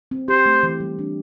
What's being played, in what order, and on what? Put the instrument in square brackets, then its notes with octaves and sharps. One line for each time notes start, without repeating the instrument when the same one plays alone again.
[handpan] C4
[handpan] G4 [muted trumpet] C5
[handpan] A3
E3
G3
D4